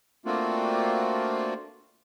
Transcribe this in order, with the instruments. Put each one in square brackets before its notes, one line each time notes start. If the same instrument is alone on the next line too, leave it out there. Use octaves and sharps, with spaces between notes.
[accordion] A3 A#3 C4 D4 F4 F#4